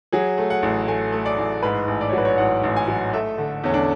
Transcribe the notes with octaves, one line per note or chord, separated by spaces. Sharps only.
F#3 G#4
A3
F#5
A1
A3 G#5
A3
D5
A1
G#2 B4
A1
D5
C#5
F#3 B4
C#5
A1 F#5
A1
G#5
F#3
A3 E5
D3
E2 C#4
D4